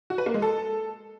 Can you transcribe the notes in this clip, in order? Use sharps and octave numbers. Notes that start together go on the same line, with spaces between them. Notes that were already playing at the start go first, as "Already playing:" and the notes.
F#4
B4
A#3
G#3
A4